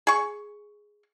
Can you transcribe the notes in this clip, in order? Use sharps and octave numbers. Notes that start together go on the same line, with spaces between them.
G#4 C#6